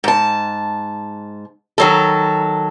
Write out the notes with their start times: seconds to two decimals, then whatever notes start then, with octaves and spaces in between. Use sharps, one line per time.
0.04 G#2 A5
1.78 D#3 F#3 A4